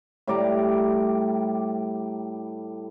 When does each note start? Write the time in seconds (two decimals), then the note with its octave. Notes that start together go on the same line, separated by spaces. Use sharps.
0.27 A2 G3 D5 A#5